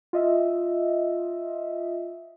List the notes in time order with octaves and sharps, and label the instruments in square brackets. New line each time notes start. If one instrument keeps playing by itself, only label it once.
[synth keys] F4 D#5 E5